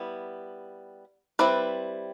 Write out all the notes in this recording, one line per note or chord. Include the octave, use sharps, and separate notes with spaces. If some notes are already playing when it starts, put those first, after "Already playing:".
Already playing: G3 B3 E4
G3 C4 E4 B4 D5